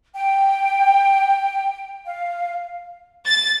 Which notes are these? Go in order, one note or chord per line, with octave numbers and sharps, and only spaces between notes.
G5
F5
A6